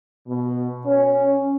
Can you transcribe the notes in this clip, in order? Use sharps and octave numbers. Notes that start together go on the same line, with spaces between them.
B2
C#4